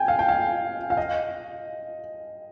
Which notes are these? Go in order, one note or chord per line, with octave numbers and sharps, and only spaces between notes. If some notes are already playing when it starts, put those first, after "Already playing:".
Already playing: G5 G#5
F5
G5
F5
F5
D#5